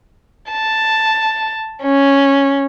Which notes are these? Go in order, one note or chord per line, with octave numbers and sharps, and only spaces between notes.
A5
C#4